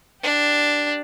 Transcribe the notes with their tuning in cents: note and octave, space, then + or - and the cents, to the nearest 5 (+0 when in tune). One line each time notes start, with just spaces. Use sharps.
D4 +0 G4 +0